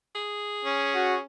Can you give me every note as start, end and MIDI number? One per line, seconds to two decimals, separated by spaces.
0.15 1.19 68
0.65 1.21 61
0.95 1.16 66